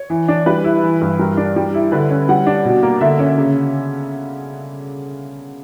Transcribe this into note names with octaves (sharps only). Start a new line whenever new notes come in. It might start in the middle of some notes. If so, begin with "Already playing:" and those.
Already playing: C#5
E3
D4
G3 B4
E4
E3
G2
G3 A#4
D4
G3
E4
D3 B4
C#4
G3 F#5
D4
B2
A#3
D3 E5
C#4
C#3